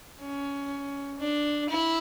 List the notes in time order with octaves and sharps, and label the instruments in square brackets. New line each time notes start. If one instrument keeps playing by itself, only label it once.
[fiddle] C#4
D4
E4